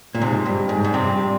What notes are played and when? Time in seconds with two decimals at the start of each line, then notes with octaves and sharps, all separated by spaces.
0.15 A#2
0.22 G#2 C3 F3 C4 G4
0.46 G2
0.69 G#2
0.84 G#2
0.93 G2 C3 F3 C4 G4